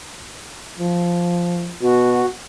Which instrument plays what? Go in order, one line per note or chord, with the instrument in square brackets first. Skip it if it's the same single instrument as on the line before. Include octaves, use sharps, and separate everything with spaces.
[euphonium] F3
[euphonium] B2 [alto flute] F#4